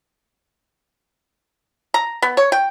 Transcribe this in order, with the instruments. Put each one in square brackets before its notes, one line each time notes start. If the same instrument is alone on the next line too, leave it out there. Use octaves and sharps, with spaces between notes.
[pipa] A#5
B3
C#5
G5